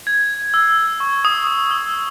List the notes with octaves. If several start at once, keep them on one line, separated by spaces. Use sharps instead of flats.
G#6
E6
C#6
D#6
D#6
E6